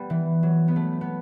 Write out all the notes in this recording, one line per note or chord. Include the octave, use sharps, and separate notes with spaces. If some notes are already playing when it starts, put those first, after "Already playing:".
Already playing: G3 B3
E3
F#3
B3
A3
B3